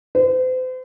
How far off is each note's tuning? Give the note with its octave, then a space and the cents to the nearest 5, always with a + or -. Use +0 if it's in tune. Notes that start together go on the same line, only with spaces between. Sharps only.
C5 -40